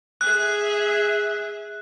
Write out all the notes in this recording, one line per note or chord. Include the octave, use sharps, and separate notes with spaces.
G#4 E5 F#6